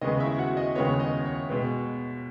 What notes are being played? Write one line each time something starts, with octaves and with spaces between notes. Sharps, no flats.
D#2 C#3 G#3 B3 D#5
E4 E5
F#4 F#5
D#5
D#2 C#3 G#3 B3 C#5
D#5
C#5
B2 G#3 B3